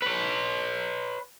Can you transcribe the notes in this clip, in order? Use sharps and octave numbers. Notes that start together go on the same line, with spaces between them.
B4 C#5